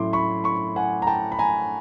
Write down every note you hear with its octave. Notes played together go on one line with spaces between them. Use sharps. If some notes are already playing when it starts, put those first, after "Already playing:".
Already playing: A2 F#3 A3 C#4 E4 C6 D6
B5 C#6
B5 C#6
F#5 G#5
A#5
G5 A5
B5
G#5 A#5